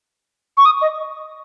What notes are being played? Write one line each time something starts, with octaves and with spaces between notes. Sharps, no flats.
C#6
D#6
D#5